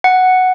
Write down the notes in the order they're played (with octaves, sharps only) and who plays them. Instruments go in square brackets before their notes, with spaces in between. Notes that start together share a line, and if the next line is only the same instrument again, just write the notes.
[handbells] F#5